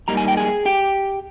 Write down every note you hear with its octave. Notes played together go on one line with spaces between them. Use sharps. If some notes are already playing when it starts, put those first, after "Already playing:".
G#2 G3 A#3 D#4 A#5
G#5
G5
G#4 G#5
G4 G5